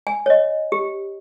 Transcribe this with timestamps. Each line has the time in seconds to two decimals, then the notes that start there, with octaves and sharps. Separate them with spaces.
0.07 G#5
0.26 C#5 D#5
0.72 G4